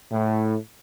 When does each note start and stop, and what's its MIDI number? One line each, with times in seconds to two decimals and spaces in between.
0.12 0.55 45